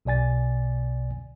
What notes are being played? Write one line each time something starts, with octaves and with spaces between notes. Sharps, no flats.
B1 B2 D5 G#5 A6